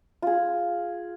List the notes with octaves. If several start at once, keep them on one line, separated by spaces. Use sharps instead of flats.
F4 G#4